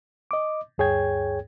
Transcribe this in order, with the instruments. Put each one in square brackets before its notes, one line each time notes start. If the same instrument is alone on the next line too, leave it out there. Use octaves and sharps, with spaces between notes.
[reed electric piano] D#5 D6
D2 G2 G#4 C#5 G5 G#6